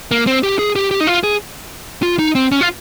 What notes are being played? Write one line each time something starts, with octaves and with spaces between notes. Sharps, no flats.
A#3
C4
G4
G#4
G4
G4
D#4
F4
G#4
F4
D#4
C4
C#4
F4